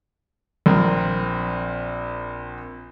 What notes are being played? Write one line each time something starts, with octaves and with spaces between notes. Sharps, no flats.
A#1 C4 A#4